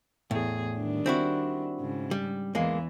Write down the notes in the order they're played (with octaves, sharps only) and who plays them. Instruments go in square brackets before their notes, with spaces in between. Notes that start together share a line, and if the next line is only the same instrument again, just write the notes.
[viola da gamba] E2 G#4 [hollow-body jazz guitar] A2
[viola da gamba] D#3 G3 D4
[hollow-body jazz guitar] C4 E4 F#4
[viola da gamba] G#2 C#3
[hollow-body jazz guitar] G3
[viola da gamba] E2 E3 [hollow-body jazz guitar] G#3 A#3